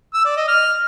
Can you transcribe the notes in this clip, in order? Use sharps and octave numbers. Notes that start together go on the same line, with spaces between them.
E6
D5
D#5
F6